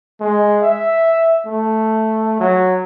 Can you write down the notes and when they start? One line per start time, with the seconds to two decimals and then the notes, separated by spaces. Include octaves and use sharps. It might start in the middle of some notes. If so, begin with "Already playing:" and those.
0.21 G#3
0.63 E5
1.46 A3
2.40 F#3